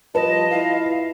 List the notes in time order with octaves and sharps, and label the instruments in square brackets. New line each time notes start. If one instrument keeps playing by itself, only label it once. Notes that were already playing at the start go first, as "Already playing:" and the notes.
[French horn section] F3 G3 F4 [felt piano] B4 [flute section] D#5 [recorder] A5
[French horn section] E4 F4 [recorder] F5